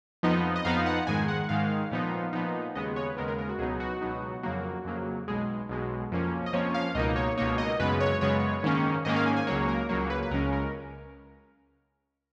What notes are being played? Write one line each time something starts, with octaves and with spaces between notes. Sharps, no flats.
F2 F3 B3 D#4 D#5
D#5
F2 F3 B3 D#4 F5
F#5
G#2 D#3 G#3 G#5
F#5
G#2 D#3 G#3 F5
A#2 F3 B3 D#4
A#2 F3 B3 D#4
D#2 C#3 G#3 B3 D#5
C#5
B4
D#2 C#3 G#3 B3 A#4
A#4
A#4
F#4
C#2 B2 F#3 B3 D#4 G#4
F#4
C#2 B2 F#3 B3 D#4
F2 C#3 F#3 A#3 F#4
F2 C#3 F#3 A#3
B1 B2 G#3 G#4
B1 B2 G#3
F2 F3 A#3 C#4
D#5
F2 F3 A#3 C#4 C#5
F5
C#2 B2 A#3 D#4 D#5
C#5
C#2 B2 A#3 D#4 C#5
D#5
F#2 C#3 G#3 B3 B4
C#5
F#2 C#3 G#3 B3 C#5
G#2 D#3 A#3 C#4
G#2 D#3 A#3 C#4 D#5
F5
G#5
G#5
C#2 C#3 F#3 A#3 C#5
A#4
C#2 C#3 F#3 A#3 C#5
B4
B4
C#2 C#3 G#3 C#4 A#4
A#4